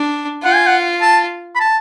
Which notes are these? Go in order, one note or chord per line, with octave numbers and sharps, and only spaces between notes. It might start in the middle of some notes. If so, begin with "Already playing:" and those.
Already playing: D4
F4 F#5
G#5
F#5
A5
B5
A5